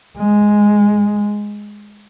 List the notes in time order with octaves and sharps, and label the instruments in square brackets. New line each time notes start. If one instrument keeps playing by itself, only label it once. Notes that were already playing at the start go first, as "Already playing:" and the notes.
[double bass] G#3